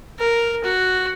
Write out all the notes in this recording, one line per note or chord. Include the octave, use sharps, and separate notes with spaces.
A#4
F#4